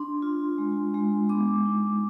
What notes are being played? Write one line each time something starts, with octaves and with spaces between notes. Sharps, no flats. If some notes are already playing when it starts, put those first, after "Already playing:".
Already playing: D4 C6
F4
G#3
G#3
B3 D6
D#4